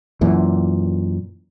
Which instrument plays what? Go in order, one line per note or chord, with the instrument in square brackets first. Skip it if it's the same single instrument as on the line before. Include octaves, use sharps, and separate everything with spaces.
[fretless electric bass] F#2 A#2 E3